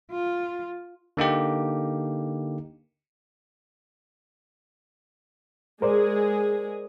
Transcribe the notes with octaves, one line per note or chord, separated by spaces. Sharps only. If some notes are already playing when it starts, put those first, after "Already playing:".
F4
D3 A#3 D#4 G4
G#3 G#4 A#4 C5 D5